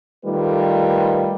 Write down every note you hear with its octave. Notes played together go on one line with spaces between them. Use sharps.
D#3 G3 A3 F4 B4